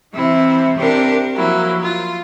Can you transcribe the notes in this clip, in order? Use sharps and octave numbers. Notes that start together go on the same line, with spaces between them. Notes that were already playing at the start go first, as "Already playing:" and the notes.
C3 E3 E4
C3 D4 G4 A#4
F3 F#3 A#3 E4
F4